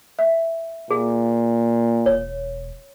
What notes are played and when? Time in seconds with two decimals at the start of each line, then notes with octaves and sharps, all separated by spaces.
0.19 E5
0.90 A#2 G#4
2.06 E1 C#5